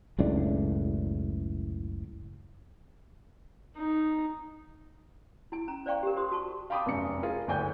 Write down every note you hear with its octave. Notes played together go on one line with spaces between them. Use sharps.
F#1 C#2 A2 D4
D#4
E4 G#5
C#4 A#5
C5 D5 F5 G5 C#6
G4 A#4
F4 G4 C5 C6 D#6
F#4 A5 C#6
F5 G5 A5 B5 D6 D#6
F1 F#2 C#7
F4 G#4 A#4
F#1 D2 D3 G5 G#5 G6